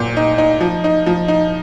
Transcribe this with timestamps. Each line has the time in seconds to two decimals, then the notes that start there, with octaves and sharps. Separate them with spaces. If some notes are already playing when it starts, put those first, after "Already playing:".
Already playing: A#2 G6
0.17 D#4
0.38 D#4
0.61 F3
0.84 D#4
1.06 F3
1.28 D#4